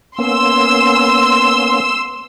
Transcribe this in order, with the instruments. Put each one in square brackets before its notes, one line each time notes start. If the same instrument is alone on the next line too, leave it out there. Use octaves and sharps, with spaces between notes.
[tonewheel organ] A#3 B3 C#4 [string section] C6 E6